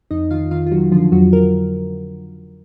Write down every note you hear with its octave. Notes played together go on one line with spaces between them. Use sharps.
F2 D#4 D#5
D#3 F4 F5
D#3 F4 F5
F4
D#3 F#3 F#4
D3 F3 F4
F2 F#3 F#4
A#4